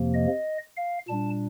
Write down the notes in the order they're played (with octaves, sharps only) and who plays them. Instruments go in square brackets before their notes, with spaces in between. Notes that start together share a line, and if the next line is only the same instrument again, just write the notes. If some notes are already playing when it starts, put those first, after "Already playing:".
Already playing: [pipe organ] F2 C3 F3 A#3
D#5
F5
A#2 G3 D4 A5